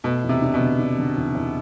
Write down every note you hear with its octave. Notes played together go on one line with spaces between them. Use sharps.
B2 A3
E2
C3
D4
B2
D3
D4
D3
E2
E2